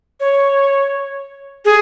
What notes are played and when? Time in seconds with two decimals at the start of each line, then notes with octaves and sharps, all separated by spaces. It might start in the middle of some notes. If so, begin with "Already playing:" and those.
0.20 C#5
1.65 G#4